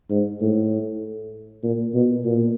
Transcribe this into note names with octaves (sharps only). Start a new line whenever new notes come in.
G#2
A2
A#2
B2
A#2